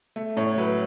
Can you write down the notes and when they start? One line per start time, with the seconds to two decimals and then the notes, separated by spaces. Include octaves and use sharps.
0.16 A3
0.37 A2 C#5
0.57 F#3 B4